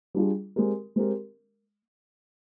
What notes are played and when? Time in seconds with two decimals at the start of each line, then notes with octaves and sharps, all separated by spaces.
0.14 G3 D4 F4 G#4
0.56 G#3 C4 G4 A#4
0.96 G#3 C4 G4 A#4